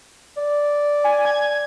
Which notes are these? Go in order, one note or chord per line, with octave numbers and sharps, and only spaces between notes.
D5
G#5
G#6